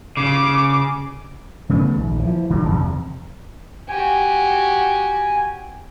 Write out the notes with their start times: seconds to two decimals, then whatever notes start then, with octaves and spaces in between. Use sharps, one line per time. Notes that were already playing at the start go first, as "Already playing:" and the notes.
0.17 C#3 D6
1.69 C#3 A3 B3
1.95 A#1 D#2
2.19 E3 F3
2.49 D1 D3 D#3 G3
2.68 E2 G2 C3
3.89 F#4 G4 G#5